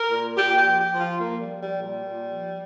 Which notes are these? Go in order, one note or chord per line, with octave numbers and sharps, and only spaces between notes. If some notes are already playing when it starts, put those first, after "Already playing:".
Already playing: A#4
A#2
A#2 G4
G4
F3
G4
F3
F4
F3 A#3
G3
F3
G3
A#2
G3
A#2
F3